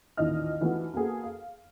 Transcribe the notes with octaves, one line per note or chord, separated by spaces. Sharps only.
A1 D#2 A#2 E4 D#5 F6
E3 F3 A3 B3 D#4 F#4
A#3 B3 F#4 G#4 A4
F5